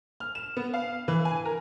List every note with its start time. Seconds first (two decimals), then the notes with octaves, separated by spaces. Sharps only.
0.20 F6
0.35 E7
0.57 B3
0.74 F5
1.08 E3
1.25 G#5
1.45 A#4